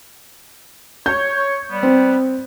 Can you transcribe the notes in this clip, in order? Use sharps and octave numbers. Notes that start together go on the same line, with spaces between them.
C#5 G6
G3 B3
C4